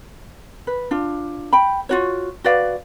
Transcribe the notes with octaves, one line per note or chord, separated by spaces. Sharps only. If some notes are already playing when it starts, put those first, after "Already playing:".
B4
D4 F4
G5 B5
F4 F#4 C#5
F#4 B4 D5 F5